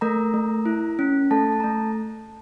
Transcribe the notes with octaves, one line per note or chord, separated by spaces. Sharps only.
A3 A#4 A#5
A3
E4
C#4
A3 A4 A5
A5
A#5
A3